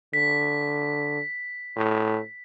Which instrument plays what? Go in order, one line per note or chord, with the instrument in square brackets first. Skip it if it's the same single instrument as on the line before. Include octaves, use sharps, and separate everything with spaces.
[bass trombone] D3 [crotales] B6
[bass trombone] A2